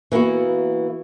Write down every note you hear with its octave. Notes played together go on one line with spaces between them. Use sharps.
E3 A#3 B3 F#4